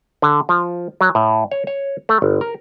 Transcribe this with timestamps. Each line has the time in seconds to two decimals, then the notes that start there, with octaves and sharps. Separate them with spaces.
0.22 D3
0.49 F3
1.01 F#3
1.15 A2
1.52 C#5
1.67 C#5
2.09 A3
2.22 G1
2.41 A#4